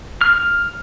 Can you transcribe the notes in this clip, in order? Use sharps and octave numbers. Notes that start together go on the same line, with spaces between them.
F6